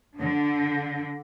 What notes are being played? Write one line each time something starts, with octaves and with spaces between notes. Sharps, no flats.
D3